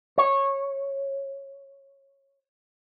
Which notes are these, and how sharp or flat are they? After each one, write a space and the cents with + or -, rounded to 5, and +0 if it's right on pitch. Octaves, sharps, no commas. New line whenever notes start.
C#5 -15